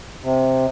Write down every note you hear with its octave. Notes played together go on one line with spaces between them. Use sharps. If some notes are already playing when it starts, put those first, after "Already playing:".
C3